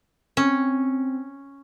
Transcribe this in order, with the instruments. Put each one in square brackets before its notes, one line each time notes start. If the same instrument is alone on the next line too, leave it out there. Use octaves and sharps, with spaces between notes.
[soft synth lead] C4 [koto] C#4